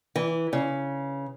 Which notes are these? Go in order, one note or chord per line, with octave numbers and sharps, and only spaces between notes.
E3
C#3